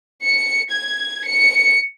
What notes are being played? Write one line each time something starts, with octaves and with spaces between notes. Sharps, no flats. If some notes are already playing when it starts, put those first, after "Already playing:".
C#7
G#6
C#7